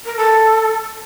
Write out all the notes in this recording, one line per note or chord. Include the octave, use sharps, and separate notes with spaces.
A#4
A4